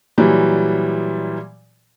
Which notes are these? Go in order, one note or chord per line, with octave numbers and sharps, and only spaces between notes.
A#2 E3 F#3 G3